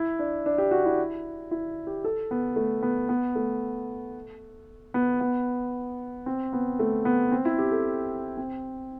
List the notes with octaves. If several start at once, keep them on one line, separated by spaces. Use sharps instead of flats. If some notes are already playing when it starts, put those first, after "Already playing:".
Already playing: E4
D4
D4
G4
F#4
E4
E4
G4
A4
B3
A3
B3
B3
A3
B3
B3
C4
B3
A3
B3
C4
E4
G4
A4
C4